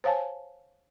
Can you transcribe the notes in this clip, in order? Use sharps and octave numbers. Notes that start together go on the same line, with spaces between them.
C5 C#5 F5 G#5 A5